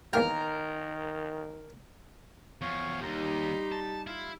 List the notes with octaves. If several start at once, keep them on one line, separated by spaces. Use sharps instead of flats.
E2 D#3 A#3 A#4 G5
E2 F3 C#5 F5 C#6
D#2 G3 D#4 G4 A#5 C6
A5
E4 F4 F5